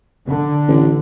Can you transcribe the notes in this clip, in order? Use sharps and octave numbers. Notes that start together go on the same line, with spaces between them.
D3
A1